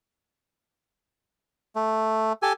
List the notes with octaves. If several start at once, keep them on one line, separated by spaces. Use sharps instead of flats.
A3
G4 A4 G#5